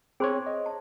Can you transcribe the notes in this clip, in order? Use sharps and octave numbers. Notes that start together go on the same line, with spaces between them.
C4 G#4 C5 C#5 C6
D#5
A5